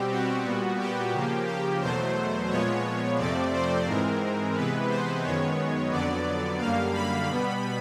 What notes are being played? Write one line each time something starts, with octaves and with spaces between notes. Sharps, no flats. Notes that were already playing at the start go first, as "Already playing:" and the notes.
Already playing: B2 G3 C4 G4
F#4
A#2 G3 B3
G4
C#3 F3 A#3
G4
E2 B2 F#3 A3 C5
A#2 F3 G#3 B3 C#5
F2 C3 F3 A3 C4 D5
C5
G#2 E3 G#3 C4 A#4
C3 E3 G#3 B3 B4
C5
F#2 D#3 G#3 B3 C#5
F2 D3 F#3 B3 D5
F#2 D3 G3 A#3 F5
B5
B2 G3 B3